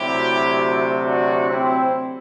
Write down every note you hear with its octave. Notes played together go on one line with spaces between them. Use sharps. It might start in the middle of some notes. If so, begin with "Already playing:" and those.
Already playing: D2 C3 F#3 E4 G4
D4 F#4
C4 E4